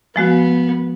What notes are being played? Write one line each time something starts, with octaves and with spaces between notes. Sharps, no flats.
F3 G#3 B3 F#4